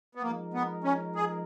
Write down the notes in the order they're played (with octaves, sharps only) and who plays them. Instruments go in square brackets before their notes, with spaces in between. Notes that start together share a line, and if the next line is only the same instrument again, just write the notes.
[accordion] B3
[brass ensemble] F3 G#3 D#4 A#4 [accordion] A#3
[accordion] B3
C#4
G#4